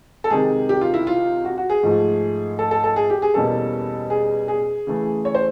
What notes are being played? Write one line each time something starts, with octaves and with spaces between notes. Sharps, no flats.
A4
C3 D#3 G#3 G#4
G4
F4
E4
F4
F#4
F#4
G#4
G#2 F3 A3
A4
A4
A4
G#4
G4
G#4
E2 B2 G3 A#3 C#4 A4
G#4
G#4
C#3 E3 A3
C#5
C5